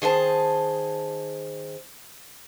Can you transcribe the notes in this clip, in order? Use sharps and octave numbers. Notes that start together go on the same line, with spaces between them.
D#3 G#4 C5 A5